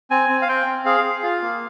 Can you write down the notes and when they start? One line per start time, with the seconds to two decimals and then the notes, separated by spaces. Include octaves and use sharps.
0.11 C4 G#5
0.30 C4
0.42 F5
0.48 C4 G5
0.66 C4
0.85 G#4 F5
1.04 G#4
1.23 F4
1.42 A#3